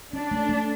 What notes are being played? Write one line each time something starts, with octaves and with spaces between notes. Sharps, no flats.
C#4 D4
A3
A3